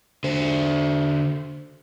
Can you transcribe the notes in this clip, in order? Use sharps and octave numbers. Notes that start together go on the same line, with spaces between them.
D3 C5